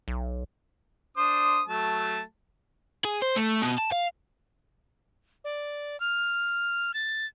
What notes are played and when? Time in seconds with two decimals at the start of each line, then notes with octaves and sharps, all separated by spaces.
0.08 B1
1.17 D4 C5 D#6
1.68 F#3 A3 A5
3.05 G#4
3.22 C5
3.36 A3
3.62 B2
3.78 A5
3.92 F5
5.44 D5
6.00 F6
6.94 A6